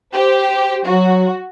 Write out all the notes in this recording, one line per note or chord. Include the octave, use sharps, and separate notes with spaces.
G4 C5
F#3 F#4